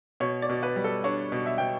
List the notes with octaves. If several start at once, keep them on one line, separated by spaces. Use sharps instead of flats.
B2 C#5
D5
B2
B4
G3
A4
D4 C#5
B2
E5
B2 G5